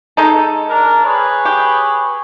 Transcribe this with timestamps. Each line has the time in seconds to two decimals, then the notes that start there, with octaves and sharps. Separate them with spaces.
0.17 G#3 D#4 A4
0.69 D4 A#4
1.04 G#4 B4 C#5
1.45 G4